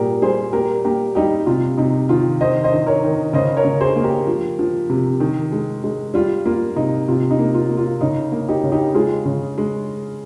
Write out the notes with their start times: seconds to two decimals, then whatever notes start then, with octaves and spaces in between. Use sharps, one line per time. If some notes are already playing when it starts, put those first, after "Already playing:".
Already playing: A#2 G3 G4 G#4 A#4
0.22 G3 G#4 C5
0.53 A#3 G4 A#4
0.85 A#3 G4 A#4
1.15 G3 D#4 G4
1.46 C3 F4
1.77 C3 D#4
2.09 D#3 F4
2.41 D#3 C5 D#5
2.64 C5 D#5
2.72 D#3
2.87 A#4 C#5
3.03 D#3
3.33 C#3 C5 D#5
3.57 A#4 C#5
3.64 C#3
3.81 G#4 C5
3.96 A#3
4.03 G4 A#4
4.27 F3
4.59 F3
4.90 C3
5.20 D#3
5.52 G#3
5.84 G#3
6.14 G3 F4
6.45 A#3 F4
6.76 C3 D#4
7.08 C3 F4
7.31 D#4
7.39 A#3
7.54 F4
7.70 A#3
7.77 F4
8.01 C#3 D#4
8.32 A#3
8.48 D#4 G4
8.63 C#3
8.72 D#4 G4
8.94 G#3 F4 G#4
9.25 C#3
9.58 G#3